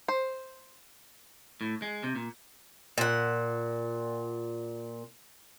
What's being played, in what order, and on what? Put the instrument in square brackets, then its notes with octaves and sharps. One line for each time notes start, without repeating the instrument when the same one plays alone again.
[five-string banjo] C5
[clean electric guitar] A2
G#3
C3
A#2
[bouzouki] A#2 F#5